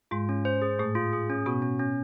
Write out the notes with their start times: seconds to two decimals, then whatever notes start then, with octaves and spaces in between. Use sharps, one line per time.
0.11 G#2 G#3 F4
0.29 C#4
0.45 C5
0.62 G#4
0.79 A2 A3 G#4
0.95 F4
1.13 G#4
1.30 C#4
1.46 B2 B3 F#4
1.62 C#4
1.79 C#4